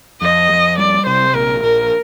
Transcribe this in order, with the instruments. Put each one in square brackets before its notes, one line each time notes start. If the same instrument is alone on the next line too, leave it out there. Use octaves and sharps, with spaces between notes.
[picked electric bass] F2 [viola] D#5
[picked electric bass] F2
[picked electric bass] G3 [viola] D5
[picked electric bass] C3 [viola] C5
[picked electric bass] A#1 [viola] A#4
[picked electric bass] A#1 [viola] A#4